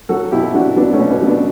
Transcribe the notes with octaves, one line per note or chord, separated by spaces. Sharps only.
F#3 F#4 A4
B2 E4 G4
F#3 D4 F#4
F#3 B3 D4
A3 C#4
B2
B3
F#3
B3 D4